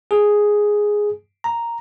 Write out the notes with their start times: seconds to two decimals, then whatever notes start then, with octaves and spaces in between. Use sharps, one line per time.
0.11 G#4
1.44 A#5